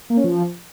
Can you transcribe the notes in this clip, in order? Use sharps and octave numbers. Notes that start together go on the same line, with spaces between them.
A#3
C#4
F3